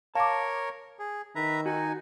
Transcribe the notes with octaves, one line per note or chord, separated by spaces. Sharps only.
A#4 C#5 F5 A5 D6
G#4
D#3 B4 E5 A#5
D#4 F#4 G#5